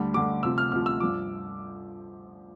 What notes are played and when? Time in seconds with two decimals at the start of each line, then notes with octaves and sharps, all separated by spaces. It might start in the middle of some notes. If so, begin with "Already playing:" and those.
Already playing: D2 D3 G3
0.14 D2 D3 G3 D6
0.43 D2 C3 F3 E6
0.58 F6
0.72 D2 C3 F3 F6
0.86 E6
1.00 G2 F3 D6